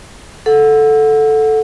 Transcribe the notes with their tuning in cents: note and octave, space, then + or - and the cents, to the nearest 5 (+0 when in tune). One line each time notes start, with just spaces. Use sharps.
A4 -5 F#5 -20